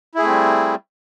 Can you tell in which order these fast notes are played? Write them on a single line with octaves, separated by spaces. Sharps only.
E4 G#4 A3 C4 G3